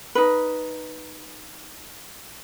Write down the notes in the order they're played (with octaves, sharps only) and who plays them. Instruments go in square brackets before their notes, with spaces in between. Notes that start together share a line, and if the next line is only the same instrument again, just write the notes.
[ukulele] D#4 B4